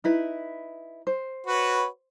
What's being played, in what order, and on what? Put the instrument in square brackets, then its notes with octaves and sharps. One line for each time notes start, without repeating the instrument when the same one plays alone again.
[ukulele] D#4 E4 B4
C5
[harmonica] F#4 B4 C#5